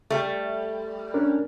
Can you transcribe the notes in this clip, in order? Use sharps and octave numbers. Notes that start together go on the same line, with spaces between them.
G3 A3
C#4 D4 A#4